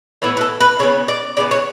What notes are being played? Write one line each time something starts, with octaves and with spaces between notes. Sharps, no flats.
A2 E3 B3 E4
B4
A4
B4
C#3 E3 B3 C#5
D5
C#3 E3 B3 D5
C#5